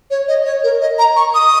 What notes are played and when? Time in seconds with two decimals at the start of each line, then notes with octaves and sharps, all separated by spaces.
0.10 C#5
0.28 D#5
0.45 C#5
0.64 A#4
0.81 D#5
0.99 A#5
1.16 C#6
1.35 D#6